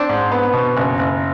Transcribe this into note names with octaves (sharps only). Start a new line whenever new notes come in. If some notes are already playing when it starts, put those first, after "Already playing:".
Already playing: C4 D4
G#2
B3
B2
F#1
F#1